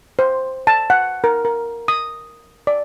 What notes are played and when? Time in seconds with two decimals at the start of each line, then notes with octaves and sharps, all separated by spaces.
0.19 C5
0.67 A5
0.90 F#5
1.24 A#4
1.45 A#4
1.88 D#6
2.67 D5